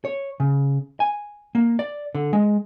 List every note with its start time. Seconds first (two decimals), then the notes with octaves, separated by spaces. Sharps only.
0.05 C#5
0.40 C#3
1.00 G#5
1.55 A#3
1.79 D5
2.15 D3
2.33 G#3